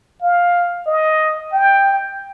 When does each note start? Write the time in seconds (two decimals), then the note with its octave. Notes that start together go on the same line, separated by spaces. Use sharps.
0.22 F5
0.87 D#5
1.53 G5